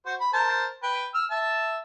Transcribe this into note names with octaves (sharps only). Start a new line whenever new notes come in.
F#4 C5
B5
A#4 C5 A5
B4 G5
E6 F6
E5 A5